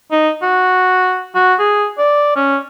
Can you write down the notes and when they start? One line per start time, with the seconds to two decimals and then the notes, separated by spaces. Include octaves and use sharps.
0.12 D#4
0.42 F#4
1.35 F#4
1.59 G#4
1.98 D5
2.36 C#4